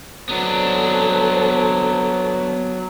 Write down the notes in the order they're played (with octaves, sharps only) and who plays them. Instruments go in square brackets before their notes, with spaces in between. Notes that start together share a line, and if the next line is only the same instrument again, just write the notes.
[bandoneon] F#3 [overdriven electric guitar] B3 D4 [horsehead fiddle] A4 C5